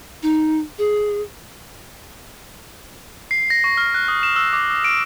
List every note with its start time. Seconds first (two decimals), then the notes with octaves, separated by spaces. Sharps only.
0.23 D#4
0.78 G#4
3.31 C7
3.50 A#6
3.64 C#6
3.77 F6
3.94 F#6
4.08 D#6
4.23 E7
4.36 E6
4.53 D6
4.70 D#6
4.84 D7